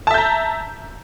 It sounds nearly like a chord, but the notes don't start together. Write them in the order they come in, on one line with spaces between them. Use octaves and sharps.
A5 E5 G6 A#5